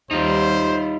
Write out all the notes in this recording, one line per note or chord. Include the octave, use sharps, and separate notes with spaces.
D#2 G3 D#4 F4 C5